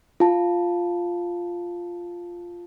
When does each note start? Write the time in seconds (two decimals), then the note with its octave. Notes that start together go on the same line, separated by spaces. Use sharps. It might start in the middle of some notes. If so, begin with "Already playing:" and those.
0.20 F4 A5